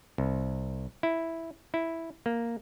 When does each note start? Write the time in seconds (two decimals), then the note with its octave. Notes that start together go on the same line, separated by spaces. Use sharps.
0.18 C2
1.03 E4
1.74 E4
2.26 A#3